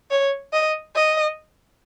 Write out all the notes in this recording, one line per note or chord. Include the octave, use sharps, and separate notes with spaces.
C#5
D#5
D#5